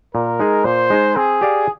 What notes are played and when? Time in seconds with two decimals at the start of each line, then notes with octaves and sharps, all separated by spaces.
0.14 A#2 A#4
0.39 G#3 D#4 G#4
0.65 A#2 C5
0.90 G#3 D#4 G#4
1.16 C4 G#4
1.41 G4 D5 F5